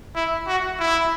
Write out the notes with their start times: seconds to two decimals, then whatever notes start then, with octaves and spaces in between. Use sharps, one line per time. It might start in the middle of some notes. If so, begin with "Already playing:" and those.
0.15 E4
0.47 F#4
0.79 E4